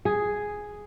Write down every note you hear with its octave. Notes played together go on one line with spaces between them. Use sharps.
G#4